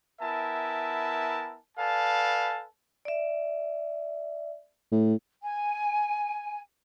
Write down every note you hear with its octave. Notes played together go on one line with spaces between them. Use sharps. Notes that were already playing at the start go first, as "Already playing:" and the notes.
B3 E4 A#4 E5 G#5 A5
A4 B4 D5 F5 G#5 A5
D5 E5
A2
G#5